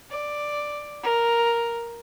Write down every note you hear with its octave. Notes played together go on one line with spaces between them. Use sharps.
D5
A#4